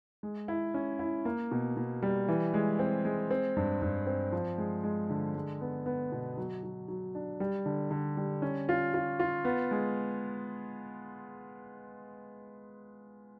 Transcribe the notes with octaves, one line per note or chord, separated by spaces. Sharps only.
G#3
E4
C#4
E4
A#3
B2
B2
G3
E3
G#3
C4
G#3
C4
G2
G2
C4
F3
G#3
G#3
D3
G#3
B3
B3
B2
F#3
F#3
F#3
D4
G3
D3
D3
G3
C#4
F4
F4
F4
B3
G#3